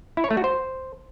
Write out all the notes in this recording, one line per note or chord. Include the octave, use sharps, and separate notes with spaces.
E4
C#5
A3
F#4
C5